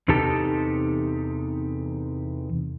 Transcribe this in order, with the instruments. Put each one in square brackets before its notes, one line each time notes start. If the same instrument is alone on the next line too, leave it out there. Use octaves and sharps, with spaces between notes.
[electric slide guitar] E2 C3 D#4 G4 A4 A5